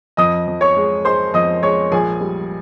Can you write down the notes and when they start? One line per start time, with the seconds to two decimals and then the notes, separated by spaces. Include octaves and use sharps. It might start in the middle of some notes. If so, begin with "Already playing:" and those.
0.17 F2 D#5 D#6
0.48 F2
0.61 C#5 C#6
0.77 G#3
1.05 G#3 C5 C6
1.34 F2 D#5 D#6
1.63 G#3 C#5 C#6
1.92 A#1 G#4 G#5
2.21 G3